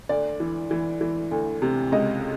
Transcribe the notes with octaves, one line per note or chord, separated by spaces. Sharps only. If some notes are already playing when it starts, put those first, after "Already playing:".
D2 D5
E3
E3
E3
D2
C3
C#2 D#5